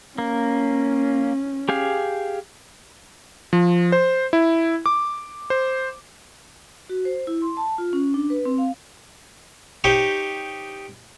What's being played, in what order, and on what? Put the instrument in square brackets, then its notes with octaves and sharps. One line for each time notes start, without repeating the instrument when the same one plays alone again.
[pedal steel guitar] A#3 [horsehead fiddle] C#4
[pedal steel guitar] G4 G#4 F5
[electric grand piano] F3
C5
E4
D6
C5
[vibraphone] F#4
C5
E4
C6
A5
F4
C#4
D4
B4
C4
F5
[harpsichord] D#4 G4 C5 C#5 D#5